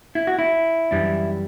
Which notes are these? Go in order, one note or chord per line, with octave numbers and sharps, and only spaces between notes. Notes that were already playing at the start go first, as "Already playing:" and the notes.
E4
F#4
E4
F#2 E3 G3 D4